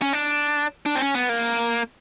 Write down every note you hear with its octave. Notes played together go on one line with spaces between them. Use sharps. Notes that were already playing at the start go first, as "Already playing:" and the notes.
C#4
D4
D4
C4
C#4
B3
A#3